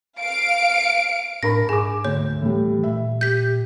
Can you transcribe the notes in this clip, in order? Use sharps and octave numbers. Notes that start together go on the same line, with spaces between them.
F5 D7
A2 D4 A#4 B5 A#6
G#2 G#4 G#5 D6
D2 C#5
A2 E3 G3
A#2 E5
G4 G6 B6